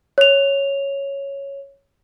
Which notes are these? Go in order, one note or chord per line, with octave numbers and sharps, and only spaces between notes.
C#5 F7